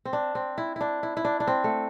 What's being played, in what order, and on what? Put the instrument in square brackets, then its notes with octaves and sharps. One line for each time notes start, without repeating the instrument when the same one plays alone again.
[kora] C4
D4
C4
E4
D4 E4
E4
E4
D4
D4
C4
A3